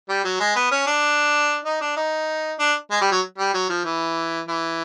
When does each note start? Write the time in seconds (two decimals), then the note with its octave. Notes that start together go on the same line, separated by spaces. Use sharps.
0.09 G3
0.24 F#3
0.40 G#3
0.56 B3
0.71 C#4
0.87 D4
1.65 D#4
1.81 D4
1.97 D#4
2.59 D4
2.91 G#3
3.01 G3
3.12 F#3
3.38 G3
3.54 F#3
3.69 F3
3.85 E3
4.48 E3